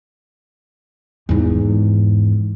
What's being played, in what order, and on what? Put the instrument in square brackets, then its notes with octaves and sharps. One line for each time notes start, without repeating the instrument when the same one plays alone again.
[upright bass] E2 G#2